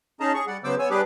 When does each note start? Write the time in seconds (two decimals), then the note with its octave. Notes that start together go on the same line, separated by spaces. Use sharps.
0.20 C#4 D#4 G#4 D#5 A5 A#5
0.34 G#4 C#6
0.47 G3 D5 F#5
0.64 C#3 F#3 B3 C5 D6 E6
0.79 B3 C#5 G#5 E6
0.90 G3 D4 G4 G#4 B4 D6